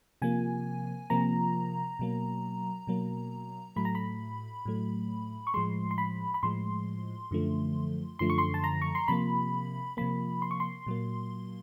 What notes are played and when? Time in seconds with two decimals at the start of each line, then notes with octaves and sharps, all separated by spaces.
0.22 C3 F3 A#3 G#5
1.10 C3 F3 A#3 A#5
1.99 B2 F#3 A#3
2.87 B2 F#3 A#3
3.76 A2 F#3 A3 B5
3.85 A#5
3.95 B5
4.66 A2 F#3 A3
5.47 C#6
5.54 A2 F3 G#3 C6
5.91 C6
5.98 B5
6.34 B5
6.43 A2 F3 G#3 C6
7.31 F#2 D3 F3 A3
8.19 F#2 D3 F3 A3 C6
8.30 C#6
8.38 C6
8.54 A5
8.64 A#5
8.82 C#6
8.95 C6
9.08 C3 F3 A#3 B5
9.97 C3 F3 A#3 B5
10.42 C6
10.51 C#6
10.60 C6
10.87 A#2 F#3 A#3